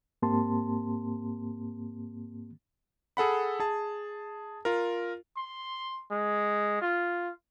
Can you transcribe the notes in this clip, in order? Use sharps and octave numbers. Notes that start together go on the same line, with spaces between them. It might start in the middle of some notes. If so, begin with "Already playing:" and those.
G#2 A#3 C4 G4 A5 C6
G#4 A4 F#5 B5
G#4 A5
F4 A#4
C6
G#3
F4